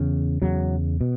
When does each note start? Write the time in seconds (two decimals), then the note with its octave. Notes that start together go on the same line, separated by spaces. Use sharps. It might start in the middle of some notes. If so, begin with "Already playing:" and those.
Already playing: E2 C#3
0.42 E2 C#3 F#3
1.01 B2